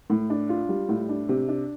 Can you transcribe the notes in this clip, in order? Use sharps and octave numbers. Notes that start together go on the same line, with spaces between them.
A2
D4
F4
G3
A2
D4
C3
D4